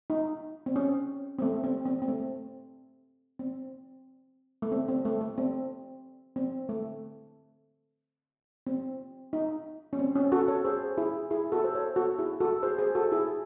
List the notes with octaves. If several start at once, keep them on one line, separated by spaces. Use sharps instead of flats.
D#4
C4
C#4
C4
A3
C4
C4
C4
A3
C4
A3
C4
C4
A3
A3
C4
C4
A3
C4
D#4
C#4
C4
C#4
F#4 A4
A4 C#5
G#4 C5
E4 G#4
E4 G#4
F#4 A4
C5
A4 C#5
F#4 A4
E4 G#4
F#4 A4
G#4 C5
G#4 C5
F#4 A4
E4 G#4